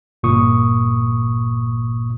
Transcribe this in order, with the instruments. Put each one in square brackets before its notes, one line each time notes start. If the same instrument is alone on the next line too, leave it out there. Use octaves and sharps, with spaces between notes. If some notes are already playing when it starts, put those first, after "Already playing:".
[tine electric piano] G1 A#2 C#6 D#6